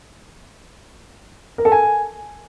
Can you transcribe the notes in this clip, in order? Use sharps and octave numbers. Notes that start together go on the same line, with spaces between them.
A#4
A4
G#5